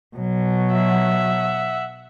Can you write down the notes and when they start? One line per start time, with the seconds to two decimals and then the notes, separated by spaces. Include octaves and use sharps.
0.17 B2 F#3
0.73 E5 F#5